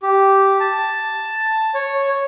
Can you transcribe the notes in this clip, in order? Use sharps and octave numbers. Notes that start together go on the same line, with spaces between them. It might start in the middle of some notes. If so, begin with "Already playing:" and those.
G4
A5
C#5